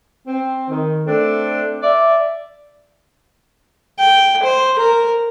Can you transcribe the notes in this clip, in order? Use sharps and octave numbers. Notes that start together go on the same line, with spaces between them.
C4
D#3
A3 C4 D4 A4
D5 E5
G5
C5
A#4